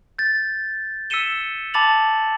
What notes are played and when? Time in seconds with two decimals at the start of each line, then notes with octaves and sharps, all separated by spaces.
0.19 G6 A6
1.10 E6 B6 C#7 D#7 E7 G7
1.74 A5 B5 D6 A6 F7 F#7